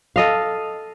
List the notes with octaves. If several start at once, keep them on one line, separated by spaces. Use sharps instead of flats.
A4 D#5 F5